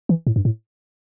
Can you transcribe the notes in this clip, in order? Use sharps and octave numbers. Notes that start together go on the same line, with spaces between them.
E3
A2
G2
A2